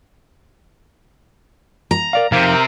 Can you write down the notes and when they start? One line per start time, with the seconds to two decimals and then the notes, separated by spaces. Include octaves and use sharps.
1.91 A#5
2.13 A#4 D5 F5
2.32 F2 C3 D#4 A#4 F5